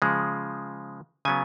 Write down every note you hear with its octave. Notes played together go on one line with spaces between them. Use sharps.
C#3 F3 G#3
C#3 F#3 B3 G#5